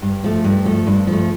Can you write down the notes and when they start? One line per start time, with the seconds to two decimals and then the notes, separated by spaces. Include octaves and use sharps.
0.02 G2
0.24 F3 A3
0.44 G2
0.65 F3 A3
0.87 G2
1.07 F3 A3